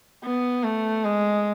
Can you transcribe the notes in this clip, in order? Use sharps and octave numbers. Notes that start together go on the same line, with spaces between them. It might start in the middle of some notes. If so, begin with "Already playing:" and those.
B3
A3
G#3